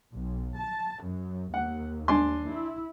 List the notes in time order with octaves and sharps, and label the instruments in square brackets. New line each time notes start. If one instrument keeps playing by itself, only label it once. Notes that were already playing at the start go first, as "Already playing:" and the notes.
[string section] B1
A5
F#2
[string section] D#2 [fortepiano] F#5
[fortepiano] D4 G#5 C6
[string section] E4